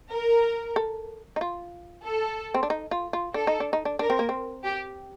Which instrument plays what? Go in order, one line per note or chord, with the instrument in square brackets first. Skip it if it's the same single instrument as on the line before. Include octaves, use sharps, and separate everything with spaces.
[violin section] A#4
[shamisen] A4
D#4
F4
[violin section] A4
[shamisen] C4
D4
D#4
F4
F4
[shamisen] D4 [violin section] A4
[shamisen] D#4
D4
D#4
D4
[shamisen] D4 [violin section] A#4
[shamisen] C4
A#3
C4
[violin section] G4